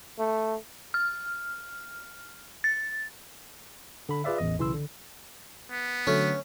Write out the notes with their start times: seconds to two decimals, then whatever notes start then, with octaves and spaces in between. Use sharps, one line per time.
0.19 A3
0.94 F6
2.64 A6
4.09 D3 B5
4.24 F4 G#4 B4 D5 E5 F5
4.38 A1 E2 D#5
4.58 B1 C#3 E3 E4 C6 E6
4.73 D3
5.71 B3
6.07 D3 F#3 A3 C#4